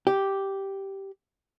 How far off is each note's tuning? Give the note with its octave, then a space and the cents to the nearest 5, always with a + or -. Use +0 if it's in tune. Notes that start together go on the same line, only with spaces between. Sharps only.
G4 -5